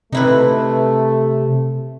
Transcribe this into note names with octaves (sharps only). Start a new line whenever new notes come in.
C3 A3 D#4 E4 B4